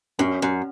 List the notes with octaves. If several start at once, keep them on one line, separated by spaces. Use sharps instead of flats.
F#2 C#4
F#2